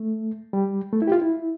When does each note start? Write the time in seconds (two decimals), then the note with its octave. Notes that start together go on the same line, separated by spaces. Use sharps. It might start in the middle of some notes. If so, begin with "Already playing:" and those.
Already playing: A3
0.53 G3
0.93 A3
1.02 E4
1.07 G4
1.12 F4
1.22 E4